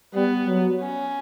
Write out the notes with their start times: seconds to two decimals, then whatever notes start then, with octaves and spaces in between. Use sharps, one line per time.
0.14 G3 B3
0.47 F#3
0.80 C#4